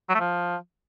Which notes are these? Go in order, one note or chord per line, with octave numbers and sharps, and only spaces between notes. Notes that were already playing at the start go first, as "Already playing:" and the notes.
F#3
A3
F3